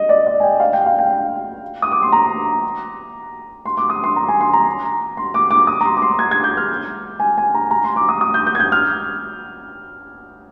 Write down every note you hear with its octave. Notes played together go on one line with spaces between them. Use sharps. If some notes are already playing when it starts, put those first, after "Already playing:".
Already playing: D#5
D5
D#5
G#5
G5
F5
G5
F5
G5
D#6
D6
C6
A#5
C6
D6
D#6
C6
A#5
G#5
C6
A#5
C6
D6
D6
D#6
A#5
C6
D6
C6
G#6
G#6
G6
F6
G#5
G#5
A#5
A#5
C6
D6
D#6
D#6
G6
G6
G#6
G6
F6